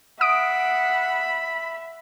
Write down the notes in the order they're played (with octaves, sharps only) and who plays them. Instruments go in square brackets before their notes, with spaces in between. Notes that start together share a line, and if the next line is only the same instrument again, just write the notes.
[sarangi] E5 [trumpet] F#5 [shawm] B5 [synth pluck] D#6 D7